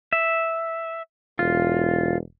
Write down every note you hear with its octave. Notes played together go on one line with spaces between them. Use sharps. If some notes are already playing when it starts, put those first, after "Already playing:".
E5
E1 F4